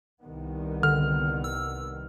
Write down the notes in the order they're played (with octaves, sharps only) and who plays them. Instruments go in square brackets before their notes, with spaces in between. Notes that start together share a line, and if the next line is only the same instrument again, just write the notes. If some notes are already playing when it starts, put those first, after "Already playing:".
[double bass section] C2 D#3 B3
[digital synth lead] D3 [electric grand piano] F6
[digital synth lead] E6